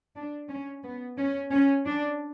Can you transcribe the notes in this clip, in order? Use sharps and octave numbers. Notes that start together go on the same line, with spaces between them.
D4
C#4
B3
C#4
C#4
D4